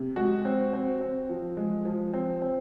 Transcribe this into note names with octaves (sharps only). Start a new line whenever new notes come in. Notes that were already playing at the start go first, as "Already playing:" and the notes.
Already playing: C3
G#3 F#4
C4
C4
C4
F3
G#3
F3
C4
C4